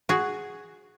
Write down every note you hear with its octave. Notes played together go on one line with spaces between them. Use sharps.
F#4 G#4